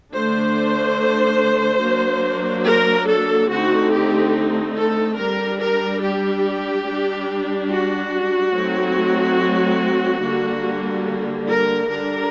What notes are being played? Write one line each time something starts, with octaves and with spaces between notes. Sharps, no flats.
D3 A3 D4 C5
F#3 A#3 D4
A#4
A4
D3 A3 C4 D#4 F#4
G4
A4
G3 D4 A#4
A#4
G4
G3 D4
F#4
F#3 A3 C4 D#4
D3 G3 A#3
A#4
D3 G3 D4 A#4